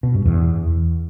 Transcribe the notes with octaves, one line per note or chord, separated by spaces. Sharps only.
B2
G2
E2